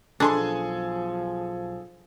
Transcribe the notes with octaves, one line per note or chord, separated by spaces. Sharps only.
B1 F3 D4 G#4 A4 G#5 B5 C6